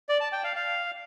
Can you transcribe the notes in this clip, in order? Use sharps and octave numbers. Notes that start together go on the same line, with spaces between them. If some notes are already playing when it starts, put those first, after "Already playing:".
D5
A5
G5
F5
F5